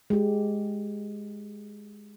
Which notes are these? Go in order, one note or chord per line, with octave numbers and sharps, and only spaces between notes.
G#3 G4